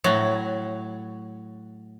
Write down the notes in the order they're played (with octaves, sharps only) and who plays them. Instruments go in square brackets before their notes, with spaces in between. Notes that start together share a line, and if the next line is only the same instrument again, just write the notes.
[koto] A2 F#3